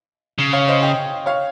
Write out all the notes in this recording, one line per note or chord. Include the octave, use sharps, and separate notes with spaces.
C#3
C#5 F5
C5 D#5
D#5 G5
C#5 F5